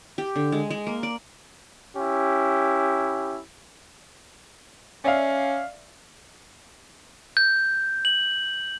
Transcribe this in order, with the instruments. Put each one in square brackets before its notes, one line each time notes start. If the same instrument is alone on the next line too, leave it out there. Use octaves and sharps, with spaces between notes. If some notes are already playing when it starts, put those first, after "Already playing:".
[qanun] G4
D3
G#3
G#3
A#3
D5
[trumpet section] C#4 E4 G4
[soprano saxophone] C#4 [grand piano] D5 E5 F5
[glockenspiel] G6
F#7